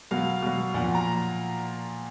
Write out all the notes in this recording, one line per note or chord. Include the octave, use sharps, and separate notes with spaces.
B2 F#3 F5
B2 F#3
A#2 F3 F#5
A#5